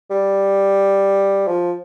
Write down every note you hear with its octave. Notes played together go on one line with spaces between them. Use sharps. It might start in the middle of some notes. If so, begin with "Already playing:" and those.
G3
F3